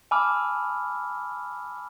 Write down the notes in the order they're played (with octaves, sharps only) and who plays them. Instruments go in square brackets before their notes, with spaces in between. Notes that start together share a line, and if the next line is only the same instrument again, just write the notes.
[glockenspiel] G#5 A5 B5 D6 E6 F6